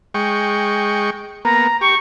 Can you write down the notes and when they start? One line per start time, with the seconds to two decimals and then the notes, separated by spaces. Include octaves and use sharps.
0.14 G#3 G5 C#6
1.45 A#3 B3 A#5
1.81 G4 C#6